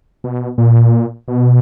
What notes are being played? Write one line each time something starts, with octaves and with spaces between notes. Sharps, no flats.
B2
A#2
B2